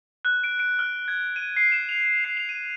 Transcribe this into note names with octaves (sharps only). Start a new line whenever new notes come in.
F#6
D7
D7
F6
G#6
D#7
C7
E7
F7
C7
F7
D#7